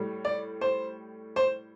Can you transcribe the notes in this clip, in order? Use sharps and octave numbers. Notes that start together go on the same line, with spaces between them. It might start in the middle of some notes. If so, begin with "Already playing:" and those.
Already playing: A2 G3
D5
C5
C5